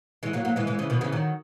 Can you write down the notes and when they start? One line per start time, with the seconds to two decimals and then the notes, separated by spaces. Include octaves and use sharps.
0.23 E3 G#3
0.33 F#3 A#3
0.45 F#3 A#3
0.56 E3 G#3
0.67 E3 G#3
0.79 C#3 E3
0.90 B2 D#3
1.01 C#3 E3
1.12 D#3 F#3